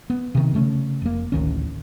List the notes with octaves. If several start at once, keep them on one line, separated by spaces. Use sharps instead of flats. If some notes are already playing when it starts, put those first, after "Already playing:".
B3
C3 D#3
C#3 A3 B3 C#4
F1 A#3
A1 D2 D#3 C#4